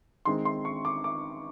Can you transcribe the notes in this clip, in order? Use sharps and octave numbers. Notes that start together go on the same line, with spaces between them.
D#3 G#3 C4 C6
C6
C#6
D6
D6